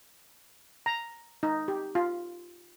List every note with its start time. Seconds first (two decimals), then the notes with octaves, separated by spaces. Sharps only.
0.86 A#5
1.43 D#4
1.68 G4
1.95 F4